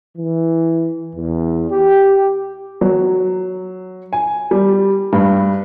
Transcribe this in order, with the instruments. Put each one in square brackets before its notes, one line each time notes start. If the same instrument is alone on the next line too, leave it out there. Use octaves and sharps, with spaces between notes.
[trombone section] E3
E2
G4
[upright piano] F#3
G#5
G3
G2